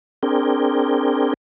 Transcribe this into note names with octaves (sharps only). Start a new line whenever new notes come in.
C4 D4 G#4 A#4 G5